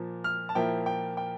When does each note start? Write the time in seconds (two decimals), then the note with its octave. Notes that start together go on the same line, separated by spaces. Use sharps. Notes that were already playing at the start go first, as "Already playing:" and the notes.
Already playing: A#2 F3 A#3
0.24 F6
0.49 A5
0.55 A#2 F3 A#3 E4 G5
0.86 G5
1.17 G5